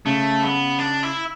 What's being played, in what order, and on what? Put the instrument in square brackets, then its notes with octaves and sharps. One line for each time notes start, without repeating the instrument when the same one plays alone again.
[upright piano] C#3 [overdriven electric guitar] A3
[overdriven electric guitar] B3
D4
E4